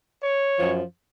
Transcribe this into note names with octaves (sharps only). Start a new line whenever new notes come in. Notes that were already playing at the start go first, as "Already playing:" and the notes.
C#5
F#2 F3